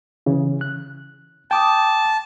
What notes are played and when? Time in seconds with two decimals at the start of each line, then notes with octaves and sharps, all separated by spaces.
0.26 C#3 E3
0.61 F#6
1.51 G5 A5 D6 D#6